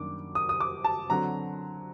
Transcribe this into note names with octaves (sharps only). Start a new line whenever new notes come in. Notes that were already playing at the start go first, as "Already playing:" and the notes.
Already playing: F#2 D#3 G3 A#3 D4 D6
D#6
D#6
D6
A5
D3 F#3 C4 A#5